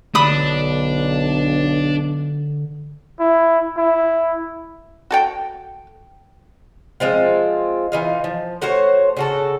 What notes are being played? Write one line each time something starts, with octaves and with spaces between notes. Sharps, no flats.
B1 D3 D4 B5 D#6
E4
E4
F#4 A4 G5
F3 G#3 C4 F4
E3 D#4 F4
F3
A3 F#4 C5 C#5
C#3 F#4 A4